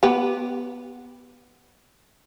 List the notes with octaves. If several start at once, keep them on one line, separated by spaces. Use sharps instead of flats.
B3 G4